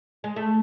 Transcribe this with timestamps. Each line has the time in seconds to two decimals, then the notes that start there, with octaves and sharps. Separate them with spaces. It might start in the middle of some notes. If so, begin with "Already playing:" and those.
0.24 G#3
0.36 A3